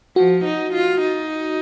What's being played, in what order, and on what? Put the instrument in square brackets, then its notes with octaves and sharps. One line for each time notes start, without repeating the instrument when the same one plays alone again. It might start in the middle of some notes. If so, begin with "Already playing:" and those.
[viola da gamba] F3 [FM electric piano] F#4
[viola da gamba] D#4
F4
D#4